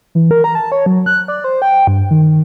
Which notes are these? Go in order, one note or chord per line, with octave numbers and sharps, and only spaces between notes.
E3
A#4
A#5
A5
C#5
F#3
F#6
D5
C5
G5
G2
D#3